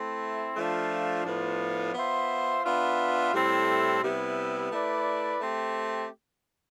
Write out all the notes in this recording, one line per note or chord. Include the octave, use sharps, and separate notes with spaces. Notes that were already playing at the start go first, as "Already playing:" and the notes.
Already playing: A3 C4 E4
F3 A3 D4 F4
A2 F3 B3 D4 F4
B3 F4 C5 E5
B3 D4 F4 B4 E5
A2 G3 C4 E4 A4
C3 G3 B3 E4
A3 E4 B4 D5
A3 C4 G4